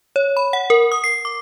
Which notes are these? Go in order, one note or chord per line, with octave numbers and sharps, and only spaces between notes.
C#5
B5
F#5
A#4
D#6
C7
D6